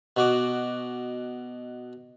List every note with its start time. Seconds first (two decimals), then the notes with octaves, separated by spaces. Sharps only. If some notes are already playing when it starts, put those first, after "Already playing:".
0.17 B2 F#4 D6